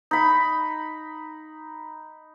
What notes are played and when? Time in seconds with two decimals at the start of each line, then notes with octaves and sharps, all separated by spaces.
0.11 D#4 B5